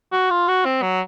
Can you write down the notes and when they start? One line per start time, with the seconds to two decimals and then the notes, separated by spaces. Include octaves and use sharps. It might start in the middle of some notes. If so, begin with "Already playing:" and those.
0.12 F#4
0.30 F4
0.48 F#4
0.65 C4
0.82 F#3